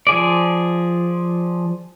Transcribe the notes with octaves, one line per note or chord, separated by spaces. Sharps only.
F3 G#4 D5